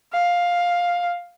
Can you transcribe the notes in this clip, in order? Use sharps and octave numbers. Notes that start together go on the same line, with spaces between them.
F5